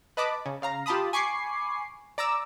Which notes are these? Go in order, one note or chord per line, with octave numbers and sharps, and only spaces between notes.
B4 D#5 A5 B5 D6
C#3
C#3 F5 A#5
F4 G4 A5 B5 D#6
G#5 B5 C#6 D6 C7
D5 A#5 D6 E6